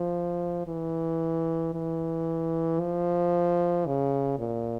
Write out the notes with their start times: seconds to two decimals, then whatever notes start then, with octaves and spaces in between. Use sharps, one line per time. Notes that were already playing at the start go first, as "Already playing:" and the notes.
Already playing: F3
0.67 E3
1.74 E3
2.80 F3
3.86 C#3
4.39 A#2